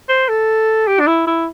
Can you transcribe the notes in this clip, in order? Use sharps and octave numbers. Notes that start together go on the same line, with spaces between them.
C5
A4
G4
D4
E4
E4